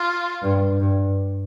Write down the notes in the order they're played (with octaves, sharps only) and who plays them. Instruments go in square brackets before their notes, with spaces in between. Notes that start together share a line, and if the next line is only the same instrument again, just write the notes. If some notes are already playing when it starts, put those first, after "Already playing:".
Already playing: [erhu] F4
[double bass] G2
G2